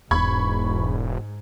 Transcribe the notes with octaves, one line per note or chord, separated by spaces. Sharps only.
E1 E2 G#2 B5 C#6 G#6